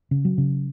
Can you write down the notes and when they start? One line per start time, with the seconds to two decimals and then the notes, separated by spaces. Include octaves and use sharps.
0.11 C#3
0.25 F#3
0.38 C#3